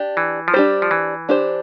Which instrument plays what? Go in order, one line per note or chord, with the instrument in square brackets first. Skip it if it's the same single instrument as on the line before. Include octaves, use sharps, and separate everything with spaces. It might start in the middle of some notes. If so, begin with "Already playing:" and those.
Already playing: [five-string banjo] D4 G4
[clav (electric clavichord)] E3
F3
[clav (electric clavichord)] G3 [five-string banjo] D4 G4 C5
[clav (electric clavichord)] F3
E3
[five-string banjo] D4 G4 C5